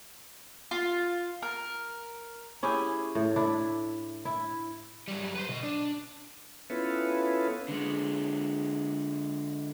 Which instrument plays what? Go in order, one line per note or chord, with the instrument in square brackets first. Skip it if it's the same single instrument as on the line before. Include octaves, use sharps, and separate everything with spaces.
[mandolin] F4
A#4
[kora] C#4 E4 G4 G#4
A2
D4 E4
E4
[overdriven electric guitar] F#2 G3
B4 C5
B2 D#5
D4
[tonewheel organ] B3 C#4 E4 F4 A4 B4
[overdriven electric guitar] D3 G#3